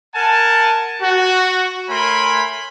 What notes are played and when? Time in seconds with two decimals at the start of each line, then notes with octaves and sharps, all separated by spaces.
0.15 A#4 F#5 G#5 A5
1.01 F#4
1.89 A3 A#4 C#5 G#5 B5 C6